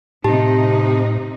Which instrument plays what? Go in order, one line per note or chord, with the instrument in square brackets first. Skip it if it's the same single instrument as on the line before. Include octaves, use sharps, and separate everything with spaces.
[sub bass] A2 [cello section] C3 D#4 [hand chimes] G4 A5